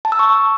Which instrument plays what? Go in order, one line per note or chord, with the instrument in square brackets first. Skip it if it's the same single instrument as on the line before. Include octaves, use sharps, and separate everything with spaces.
[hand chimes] A5
E6
C#6